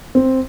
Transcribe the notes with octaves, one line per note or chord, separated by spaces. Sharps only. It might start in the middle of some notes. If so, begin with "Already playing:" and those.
C4